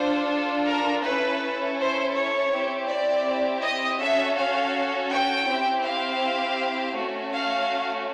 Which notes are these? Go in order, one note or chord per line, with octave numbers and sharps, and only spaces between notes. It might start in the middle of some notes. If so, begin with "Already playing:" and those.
Already playing: D4 F4 A4 C5
A#4
C#4 E4 A4 B4
C5
C#5
C4 E4 G4
D5
D#5
C#4 F#4 A4 E5
F5
G5
C4 E4 G4
F5
A3 C#4 F#4
F5